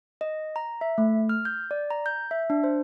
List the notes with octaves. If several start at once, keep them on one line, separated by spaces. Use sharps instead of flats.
D#5
A#5
E5
A3
F6
G6
D5
A#5
G6
E5
D4
C5